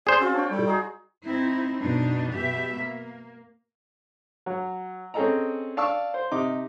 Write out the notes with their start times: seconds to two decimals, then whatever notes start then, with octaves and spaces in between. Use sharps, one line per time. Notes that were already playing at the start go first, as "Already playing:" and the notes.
0.07 G#4 C5 D5
0.21 C4 C#4 F4 F#4
0.34 D4 C#5 G5
0.51 G3 A4
0.67 D#4 F#4 G#4
1.24 C4 D#4 E4
1.81 F#2 B2 D4 D#4
2.34 B2 G4 E5
2.75 A#3
4.46 F#3
5.14 C4 C#4 G#4 A4 D#5 A#5
5.77 D5 F5 A5 C#6 D6 E6
6.14 C5
6.31 C3 D#4 D6